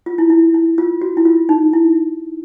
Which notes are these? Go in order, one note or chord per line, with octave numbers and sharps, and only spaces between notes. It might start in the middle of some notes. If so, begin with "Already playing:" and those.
F4
E4
E4
E4
F4
F#4
E4
F4
D#4
E4